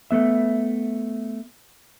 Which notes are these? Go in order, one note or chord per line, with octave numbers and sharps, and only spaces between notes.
A3 B3 E5